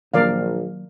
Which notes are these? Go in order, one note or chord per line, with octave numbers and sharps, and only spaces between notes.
A#1 D#3 F#3 A#3 A#4 D5 F5